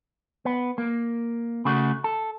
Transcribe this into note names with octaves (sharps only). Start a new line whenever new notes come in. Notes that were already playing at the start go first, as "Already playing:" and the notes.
B3
A#3
C#3 A3 F#4
A4